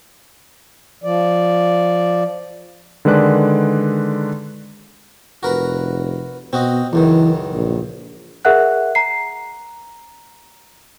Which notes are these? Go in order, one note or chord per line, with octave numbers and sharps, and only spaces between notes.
F3 D5
D3 D#3 G#3 B4 D5 F#6
F1 F#4 A#4 B4
B2 C4 F#4 D#5
C#2 F#2 D#3 E3
A#1
G#4 A#4 E5 F#5 F#6
A#5 C7